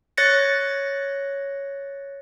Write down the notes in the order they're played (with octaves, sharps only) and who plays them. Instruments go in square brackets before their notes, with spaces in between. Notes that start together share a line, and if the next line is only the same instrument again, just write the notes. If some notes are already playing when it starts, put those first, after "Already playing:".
[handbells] C#5 F#6 A6 A#6 C#7